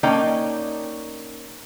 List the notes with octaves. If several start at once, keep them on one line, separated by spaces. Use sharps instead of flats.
A#3 C#4 D#4 D5 G5